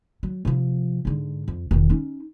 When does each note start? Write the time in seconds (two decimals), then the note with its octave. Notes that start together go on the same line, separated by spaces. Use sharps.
0.23 F#3
0.45 C3 F3
1.05 G#2 D3
1.48 F2
1.71 E1 D#3
1.90 C#4 D#4